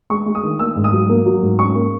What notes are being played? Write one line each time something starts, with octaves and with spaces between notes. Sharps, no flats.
G#3 C#6
G#3
D#6
D#3
A#3 E6
G#2
D#6
F#3
A#3
F#3
G#2
C#4 C#6
A#3